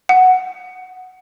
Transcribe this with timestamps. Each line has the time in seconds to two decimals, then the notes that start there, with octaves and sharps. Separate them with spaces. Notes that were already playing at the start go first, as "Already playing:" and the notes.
0.09 F#5